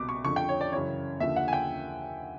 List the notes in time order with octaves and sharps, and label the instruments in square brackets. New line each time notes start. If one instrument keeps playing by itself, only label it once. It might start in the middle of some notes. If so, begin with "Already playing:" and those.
Already playing: [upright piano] C2 B2 D6
C#6
F2 D3 F3 C#6
G5
C#5
D5
F#2 C#3 E3 C#5
D#2 D3 F3 E5
F#5
G#5
G5